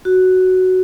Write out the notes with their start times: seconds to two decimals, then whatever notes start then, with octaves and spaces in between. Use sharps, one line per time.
0.05 F#4